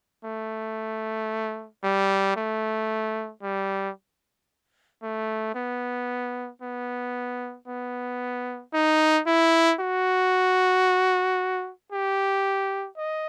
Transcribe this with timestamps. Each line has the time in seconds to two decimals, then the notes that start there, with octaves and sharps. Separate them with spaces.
0.24 A3
1.83 G3
2.36 A3
3.42 G3
5.02 A3
5.55 B3
6.62 B3
7.67 B3
8.73 D#4
9.27 E4
9.80 F#4
11.92 G4
12.98 D#5